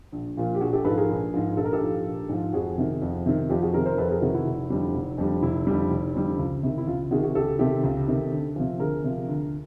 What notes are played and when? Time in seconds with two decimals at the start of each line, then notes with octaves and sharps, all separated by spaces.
0.12 A#1
0.37 A#2 F3
0.55 G4
0.61 A#1 F#4 G#4
0.73 G4 A4
0.84 G#2 F3 A4 B4
0.97 G#4 A#4
1.09 A#1
1.34 G#2 F3
1.57 A#1 A4
1.65 A#4
1.73 G4 A4
1.81 G#2 F3
2.06 A#1
2.29 G#2 F3
2.53 F2 F#4 G#4
2.78 C3 D#3
3.02 F2
3.26 C3 D#3
3.50 F2 F4 G4
3.62 F#4 G#4
3.74 C3 D#3 G#4 A#4
3.86 A#4 C5
3.98 F2 A4 B4
4.10 G#4 A#4
4.22 C3 D#3 F#4 G#4
4.34 E4 F#4
4.46 F1
4.70 F2 D3 G3
4.94 F1
5.18 F2 D3 G3
5.42 F1 E4
5.67 F2 D3 G3
5.91 F1
6.15 F2 D3 G3
6.38 C#2
6.63 C3 D#3
6.78 E4
6.87 C#2 F4
7.11 C3 D#3 F#4 G#4
7.23 F#4 G#4
7.35 C#2 G4 A4
7.59 C3 D#3 G4 A4
7.84 C#2
8.08 C3 D#3
8.32 D2
8.56 C3 F3
8.79 D2 G#4 A#4
9.04 C3 F3
9.28 D2